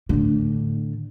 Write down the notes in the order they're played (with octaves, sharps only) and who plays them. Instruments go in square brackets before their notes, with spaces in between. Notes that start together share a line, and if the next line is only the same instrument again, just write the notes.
[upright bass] A2 D3